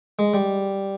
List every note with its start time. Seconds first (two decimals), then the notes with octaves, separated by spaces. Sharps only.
0.19 G#3
0.34 G3